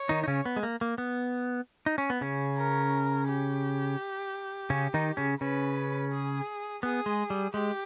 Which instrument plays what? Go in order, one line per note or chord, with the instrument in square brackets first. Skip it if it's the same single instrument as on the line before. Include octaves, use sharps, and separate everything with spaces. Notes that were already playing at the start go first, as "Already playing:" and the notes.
Already playing: [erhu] C#5
[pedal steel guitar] D#3 D#4
D#4
C#3 C#4
B3
G#3
A#3
A#3
B3
D#4
C#4
B3
C#3 C#4
[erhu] A#4
G4
[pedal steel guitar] C#3 C#4
D#3 D#4
C#3 C#4
[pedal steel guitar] C#3 C#4 [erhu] B4
[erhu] G#4
[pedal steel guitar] B3 [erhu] G#4
[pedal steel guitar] G#3
G3
[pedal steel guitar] G#3 [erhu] G4